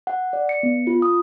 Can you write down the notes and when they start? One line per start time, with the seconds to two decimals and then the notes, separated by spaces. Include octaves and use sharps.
0.07 F#5
0.33 D5
0.49 C#7
0.63 B3
0.87 F4
1.02 D#6